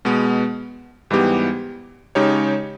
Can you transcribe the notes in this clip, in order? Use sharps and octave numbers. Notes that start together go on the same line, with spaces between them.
B2 G#3 B3
G#2 E3 G3 B3 G4
C#3 G#3 D#4 G4 C#5